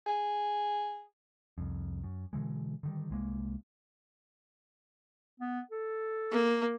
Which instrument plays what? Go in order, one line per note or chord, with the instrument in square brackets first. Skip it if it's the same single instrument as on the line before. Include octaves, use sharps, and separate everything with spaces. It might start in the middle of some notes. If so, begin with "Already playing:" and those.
[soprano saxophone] G#4
[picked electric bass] C2 F2
F#2
B2 D3 E3 G#3
D3 D#3 G3
C2 G#3 A#3
[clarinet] B3
A4
[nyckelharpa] A#3